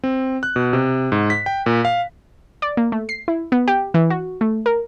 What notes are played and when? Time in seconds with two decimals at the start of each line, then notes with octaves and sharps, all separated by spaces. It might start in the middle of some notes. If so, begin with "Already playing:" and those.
0.04 C4
0.43 F#6
0.56 B2
0.73 C3
1.12 G#2
1.30 B6
1.46 G5
1.66 A#2
1.85 F5
2.62 D5
2.77 A#3
2.92 A3
3.09 C7
3.28 E4
3.52 B3
3.68 G4
3.94 E3
4.10 F#4
4.41 A3
4.66 A#4